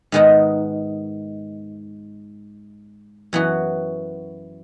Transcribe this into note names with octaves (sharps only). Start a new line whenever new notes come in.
G#2 D#3 G#3 B3 D#4
F#2 E3 B3 F#4